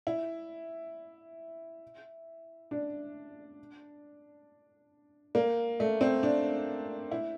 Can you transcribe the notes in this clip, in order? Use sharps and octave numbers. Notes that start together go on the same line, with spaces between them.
E4
D4
A#3
A3
C4
D4
E4